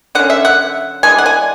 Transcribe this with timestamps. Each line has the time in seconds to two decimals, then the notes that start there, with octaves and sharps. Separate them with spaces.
0.15 D3 F#3 C#4 F#5
0.30 E5
0.45 F#5
1.03 E3 G#3 D4 G#5
1.18 F#5
1.26 G#5